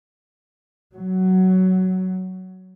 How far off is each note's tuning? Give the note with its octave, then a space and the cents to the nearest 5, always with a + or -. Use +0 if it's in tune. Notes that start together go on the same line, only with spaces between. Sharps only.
F#3 +10